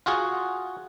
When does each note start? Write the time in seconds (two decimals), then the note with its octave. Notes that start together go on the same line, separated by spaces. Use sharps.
0.06 F4 F#4 G#4 F#5